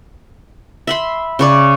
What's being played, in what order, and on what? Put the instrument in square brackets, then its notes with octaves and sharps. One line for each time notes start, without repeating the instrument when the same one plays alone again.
[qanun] E5 B5 C6
C#3 C#5 D5